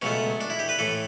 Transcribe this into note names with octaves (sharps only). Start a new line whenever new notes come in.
C#2 B2 F#3 A3 C#4
D4
E4
G4
B4
A2 E3 A4